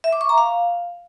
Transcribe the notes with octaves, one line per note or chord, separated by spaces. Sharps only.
E5
D6
C#6
A#5
F5